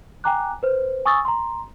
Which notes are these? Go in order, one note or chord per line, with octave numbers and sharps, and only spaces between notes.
G5 G#5 A#5 D6 F#6
B4 C5
G#5 C#6 D#6 E6 A6
A#5 C6